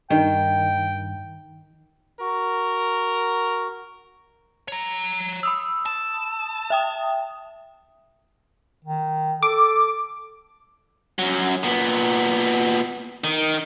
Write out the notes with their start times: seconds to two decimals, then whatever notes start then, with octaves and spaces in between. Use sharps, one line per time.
0.10 G2 D#3 G5
2.20 F#4 A#4
4.68 C#5 A#5
5.43 B5 D#6 E6
5.86 A5
6.70 E5 G5 D#6
8.85 D#3
9.43 A4 D6
11.19 F#2 F#3
11.64 A#2 B3
13.24 D#3